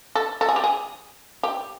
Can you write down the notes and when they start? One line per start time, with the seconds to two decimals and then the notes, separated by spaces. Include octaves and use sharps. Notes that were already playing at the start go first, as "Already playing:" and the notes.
0.15 A4
0.41 A4
0.49 G#4
0.56 G4
0.64 G#4
1.43 G4